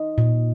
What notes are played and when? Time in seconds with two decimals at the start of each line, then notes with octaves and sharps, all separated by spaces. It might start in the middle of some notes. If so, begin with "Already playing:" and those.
Already playing: D#4 D#5
0.18 A#2